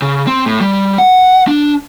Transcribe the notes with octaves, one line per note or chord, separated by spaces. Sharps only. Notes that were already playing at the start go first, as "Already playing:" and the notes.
C#3
C4
A2
G3
F#5
D4